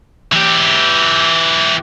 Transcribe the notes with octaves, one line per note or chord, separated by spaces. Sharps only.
E3 G4